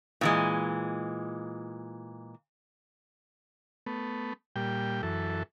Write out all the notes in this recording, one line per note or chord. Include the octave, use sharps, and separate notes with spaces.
A#2 E3 G#3
A3 B3
A#2 G3 G5
F#2 E3 A4